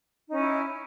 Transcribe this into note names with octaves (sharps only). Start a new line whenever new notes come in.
C#4 D#4 E4